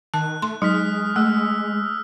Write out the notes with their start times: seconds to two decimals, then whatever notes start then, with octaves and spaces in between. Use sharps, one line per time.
0.14 D#3 A5 F#6
0.42 A3 C6
0.62 F#3 G#3 D#4 D#6 F6 B6
1.16 A3 E6